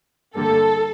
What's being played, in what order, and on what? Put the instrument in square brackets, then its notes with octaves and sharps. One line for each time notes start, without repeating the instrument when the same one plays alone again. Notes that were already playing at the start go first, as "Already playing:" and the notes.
[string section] G2 D3 G3 A#3 A4